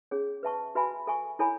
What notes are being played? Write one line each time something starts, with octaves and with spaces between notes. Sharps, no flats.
C#4 G#4 C#5
B4 E5 A5 C#6
F#4 B4 E5 G#5 B5
A4 E5 G#5 C#6
E4 A4 C#5 G#5 B5